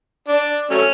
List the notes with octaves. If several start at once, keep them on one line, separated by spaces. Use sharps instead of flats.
D4
F#3 A3 C#4